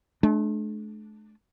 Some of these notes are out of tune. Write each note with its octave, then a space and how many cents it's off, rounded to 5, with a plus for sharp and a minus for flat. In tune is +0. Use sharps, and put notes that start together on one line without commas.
A3 -45 D4 +10